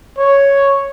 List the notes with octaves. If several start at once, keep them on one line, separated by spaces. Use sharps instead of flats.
C#5